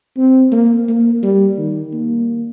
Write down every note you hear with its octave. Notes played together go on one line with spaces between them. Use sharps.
C4
A#3
A#3
G3
D#3
A#3